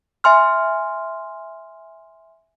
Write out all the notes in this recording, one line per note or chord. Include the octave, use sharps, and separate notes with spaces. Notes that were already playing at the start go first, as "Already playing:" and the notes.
E5 G#5 C6 F6